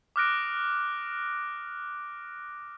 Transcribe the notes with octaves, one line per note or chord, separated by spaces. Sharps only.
D6 D#6 F6 F#6 A#6 D7